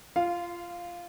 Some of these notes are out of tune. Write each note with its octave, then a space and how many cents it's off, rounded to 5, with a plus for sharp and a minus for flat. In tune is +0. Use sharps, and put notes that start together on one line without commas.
F4 -20 F5 +0